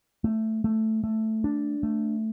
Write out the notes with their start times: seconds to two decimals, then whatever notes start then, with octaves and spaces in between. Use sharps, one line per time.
0.24 A3
0.64 A3
1.04 A3
1.44 D4
1.83 A3